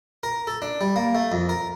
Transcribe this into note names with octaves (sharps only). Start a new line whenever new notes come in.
A#4
A4
D4
G3
A#3
A3
F2
A#4